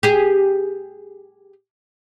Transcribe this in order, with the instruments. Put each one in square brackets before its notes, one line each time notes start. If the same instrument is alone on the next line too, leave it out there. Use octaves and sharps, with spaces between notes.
[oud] G4 G#4